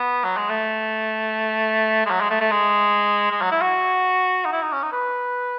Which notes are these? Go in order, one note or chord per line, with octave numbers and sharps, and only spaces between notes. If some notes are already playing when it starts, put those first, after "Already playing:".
Already playing: B3
F#3
G#3
A3
G#3
F#3
G#3
A3
A3
G#3
G#3
F#3
E4
F#4
D#4
E4
D#4
C#4
D#4
B4